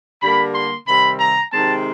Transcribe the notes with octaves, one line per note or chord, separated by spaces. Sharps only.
D3 G3 A#3 B5
C6
C3 D#3 G3 C4 B5
A#5
C3 D#3 G#3 C4 A5